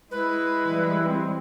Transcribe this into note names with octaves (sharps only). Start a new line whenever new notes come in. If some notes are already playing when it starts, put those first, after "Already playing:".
G#3 E4 B4
E3 G3
C4